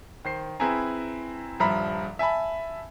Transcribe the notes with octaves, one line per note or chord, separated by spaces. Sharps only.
D#3 C5 C7
C4 E4 G#4 B4 G#5 A#5
D#1 G2 F3 E5 A#5 B5
E5 G#5 A5 B5